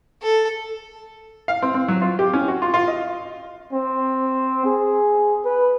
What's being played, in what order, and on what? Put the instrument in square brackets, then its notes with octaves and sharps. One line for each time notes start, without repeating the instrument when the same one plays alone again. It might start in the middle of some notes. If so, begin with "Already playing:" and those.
[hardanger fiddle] A4
[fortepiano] F5
C4
C4
F#3
F4
G4
C#4
F#4
F4
F4
D#5
[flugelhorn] C4
G#4
B4